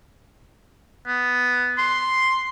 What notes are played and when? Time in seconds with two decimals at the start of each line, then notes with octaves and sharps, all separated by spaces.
1.07 B3
1.78 C6